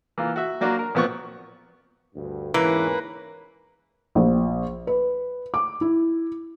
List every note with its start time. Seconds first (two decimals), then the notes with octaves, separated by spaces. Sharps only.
0.18 E3 A#3 F4
0.36 F#4 E5
0.61 F#3 A#3 D4 F#4
0.79 A#4
0.95 A#2 F3 B3 C4 C#6
2.15 D2 G2
2.54 E2 G#2 E3 A#3 C#4 B4
4.15 A#1
4.87 B4
5.54 D6
5.81 E4